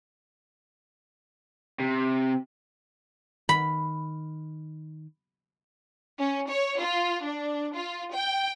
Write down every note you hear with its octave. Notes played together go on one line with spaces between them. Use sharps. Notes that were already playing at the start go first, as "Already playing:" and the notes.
C3
D#3 B5
C#4
C#5
F4
D4
F4
G5